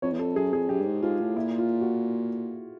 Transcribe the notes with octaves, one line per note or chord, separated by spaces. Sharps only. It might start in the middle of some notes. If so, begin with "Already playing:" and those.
F2 C#5
E2
F2 A4
F#2 G#4
F2 G#4
F#2 G4
G2
G#2
G#2 F4
A2
A#2 E4
F4
F#4